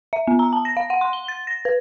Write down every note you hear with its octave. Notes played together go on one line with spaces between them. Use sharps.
E5
B3
A#5
A5
A#6
F5
F#5
C6
G7
A6
A#6
B4